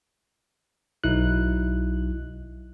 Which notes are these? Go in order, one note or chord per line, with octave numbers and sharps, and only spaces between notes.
B1 F#3 D#4 E4 F#6